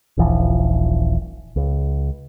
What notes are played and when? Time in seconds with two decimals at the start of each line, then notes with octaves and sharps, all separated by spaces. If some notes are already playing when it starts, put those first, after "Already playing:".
0.17 D#1 A#1 E3 F3
1.56 C#2